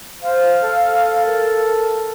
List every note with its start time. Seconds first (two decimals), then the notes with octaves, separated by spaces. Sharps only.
0.22 C5 F5
0.63 A4
1.26 A#4